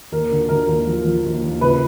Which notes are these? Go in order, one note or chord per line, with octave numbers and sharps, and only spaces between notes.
D#2 A#4
D3
D3 A#4
D#2
F3
F3
D#2
D#2
C#2 B4